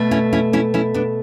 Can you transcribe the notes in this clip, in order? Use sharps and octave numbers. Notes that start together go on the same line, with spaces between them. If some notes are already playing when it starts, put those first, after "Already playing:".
Already playing: B2 A3
C#4 E4
C#4 E4
C#4 E4
C#4 E4
B3 D4